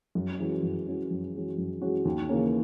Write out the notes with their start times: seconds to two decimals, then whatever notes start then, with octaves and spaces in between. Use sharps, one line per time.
0.15 F#2
0.39 E3 G#3 C#4 F#4
0.63 F#2
0.87 E3 G#3 C#4 F#4
1.11 F#2
1.34 E3 G#3 C#4 F#4
1.58 F#2
1.82 E3 G#3 C#4 F#4
2.05 D#2
2.29 C#3 E3 A#3 C#4